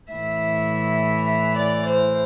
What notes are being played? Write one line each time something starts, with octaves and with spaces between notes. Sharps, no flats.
A2 E3 E5
E5
D5
C5